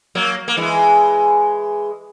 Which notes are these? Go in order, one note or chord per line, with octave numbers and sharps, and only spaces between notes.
F#3 A#3
A#3
E3 G#3